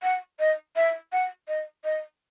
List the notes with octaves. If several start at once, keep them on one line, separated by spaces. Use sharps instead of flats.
F#5
D#5
E5
F#5
D#5
D#5